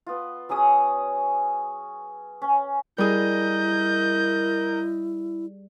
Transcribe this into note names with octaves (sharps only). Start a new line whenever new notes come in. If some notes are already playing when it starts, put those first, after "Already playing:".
B3 F4
F#3 C#4 G#4 D#6
C#4
G3 E4 G#4 A#4 D#5 G6